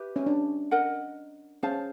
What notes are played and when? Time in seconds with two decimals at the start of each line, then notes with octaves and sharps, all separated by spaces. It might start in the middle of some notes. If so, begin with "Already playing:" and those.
Already playing: G4 B4 E5
0.16 C#4
0.26 D4
0.71 A#4 D#5 F#5
1.63 C#4 G#4 C5 F5 A5